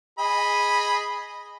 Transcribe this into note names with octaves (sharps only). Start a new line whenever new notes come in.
G#4 D#5 B5